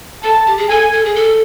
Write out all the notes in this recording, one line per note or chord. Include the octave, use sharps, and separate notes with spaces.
A4 A5
G4
G#4
A4 G#5
A4
G#4
A4